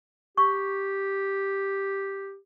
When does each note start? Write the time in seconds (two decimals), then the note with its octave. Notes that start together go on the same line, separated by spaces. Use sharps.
0.37 G4 C#6